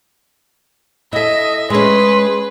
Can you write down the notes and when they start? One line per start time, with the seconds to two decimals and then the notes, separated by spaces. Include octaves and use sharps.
1.13 E4 A4 D#5 E5
1.70 G#3 C#4 G#4 B4 C6